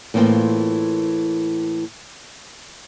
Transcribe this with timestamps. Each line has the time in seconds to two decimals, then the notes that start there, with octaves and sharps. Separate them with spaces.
0.14 A2 E3 A#3 C4 F4